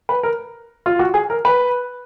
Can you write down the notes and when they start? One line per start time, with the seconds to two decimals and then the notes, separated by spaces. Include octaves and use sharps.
0.09 B4
0.23 A#4
0.86 F4
0.99 F#4
1.14 G#4
1.30 A#4
1.45 B4